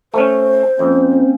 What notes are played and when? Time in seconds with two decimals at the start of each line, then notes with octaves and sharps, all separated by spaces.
0.14 A3 C#4 C5
0.79 F2 A#3 C4 C#4